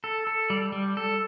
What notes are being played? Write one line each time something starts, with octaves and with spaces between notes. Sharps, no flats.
A4
A4
G3
G3
A4